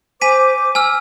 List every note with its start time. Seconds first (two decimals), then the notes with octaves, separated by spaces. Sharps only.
0.22 C5 G#5 D6 B6 D#7
0.75 G#5 E6 F6